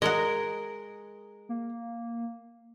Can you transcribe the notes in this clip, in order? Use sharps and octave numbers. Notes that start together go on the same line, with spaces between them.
G#3 A#4 D#5 F#5
A#3